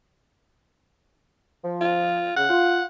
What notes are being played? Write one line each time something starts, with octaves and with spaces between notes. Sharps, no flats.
F3
F4
C#3 F#5
F4